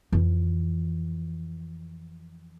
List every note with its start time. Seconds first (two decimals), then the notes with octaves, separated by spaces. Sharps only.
0.12 F2 E3